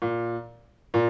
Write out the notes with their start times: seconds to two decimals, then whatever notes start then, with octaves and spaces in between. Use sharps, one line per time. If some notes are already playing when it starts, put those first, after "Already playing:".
0.02 A#2
0.94 A#2